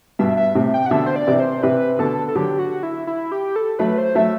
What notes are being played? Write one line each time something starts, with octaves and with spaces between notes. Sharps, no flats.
G2 B2 E5
E5
A2 C3
G5
F#5
B2 D3 E5
C5
D5
C3 E3
C5
C3 E3 B4
B2 D3 A4
A4
D3 F#3 G4
F#4
E4
E4
G4
A4
F#3 A3 B4
C5
F#3 A3 E5